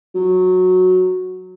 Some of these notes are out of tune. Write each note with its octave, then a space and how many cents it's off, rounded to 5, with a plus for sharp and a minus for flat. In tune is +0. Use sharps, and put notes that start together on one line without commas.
F#3 -10